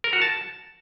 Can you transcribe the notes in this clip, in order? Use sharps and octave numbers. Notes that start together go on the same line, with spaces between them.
A#4
F#4
A5